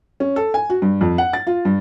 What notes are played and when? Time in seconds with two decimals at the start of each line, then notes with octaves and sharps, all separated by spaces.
0.20 C#4
0.36 A4
0.54 G#5
0.70 F#4
0.82 G2
1.01 F2
1.18 F#5
1.33 A6
1.47 F4
1.65 G2